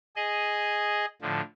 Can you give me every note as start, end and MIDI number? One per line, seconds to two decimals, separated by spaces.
0.16 1.05 68
0.16 1.05 75
1.22 1.41 45
1.22 1.41 50
1.22 1.41 53